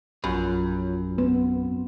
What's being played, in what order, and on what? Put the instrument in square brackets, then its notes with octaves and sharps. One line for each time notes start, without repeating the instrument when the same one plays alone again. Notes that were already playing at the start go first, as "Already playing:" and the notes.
[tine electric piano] A#1 B5 [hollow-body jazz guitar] F#2 [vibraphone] F4 C#5
[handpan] B3 [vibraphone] C4